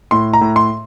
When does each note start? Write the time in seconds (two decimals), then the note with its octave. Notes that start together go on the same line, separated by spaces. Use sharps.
0.11 A2 C6
0.33 A#5
0.41 A2
0.56 C6